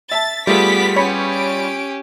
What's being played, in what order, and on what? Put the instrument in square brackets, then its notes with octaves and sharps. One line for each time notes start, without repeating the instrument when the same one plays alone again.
[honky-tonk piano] E5 A5 [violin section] A6
[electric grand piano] G3 F4 G#4 [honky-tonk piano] A3 [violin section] B3 B6 [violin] D6
[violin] C#4 G4 [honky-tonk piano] C#5 B5 C#7
[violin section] D7